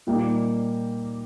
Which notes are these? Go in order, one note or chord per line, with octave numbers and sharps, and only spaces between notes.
A#2 G3 A#3 D#4